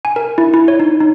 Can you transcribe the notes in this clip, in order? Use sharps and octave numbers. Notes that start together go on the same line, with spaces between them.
G#5
A#4
E4
E4
C#5
D#4
D#4